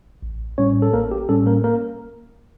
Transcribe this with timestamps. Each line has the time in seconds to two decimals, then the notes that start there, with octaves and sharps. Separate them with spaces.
0.23 A1
0.58 A2 G3 C#4 C#5
0.82 A4
0.93 A1 A#3 A#4
1.11 G4
1.29 A2 G3 C#4 A4
1.46 A#3 A#4
1.64 A#3 A#4